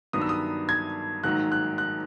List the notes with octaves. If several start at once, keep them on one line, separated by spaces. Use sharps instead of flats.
G2 D#3 F#3 B3 D4 D#6
E6
D#6
G#6
A#1 G#2 D#3 F#3 F#6
F#6
F#6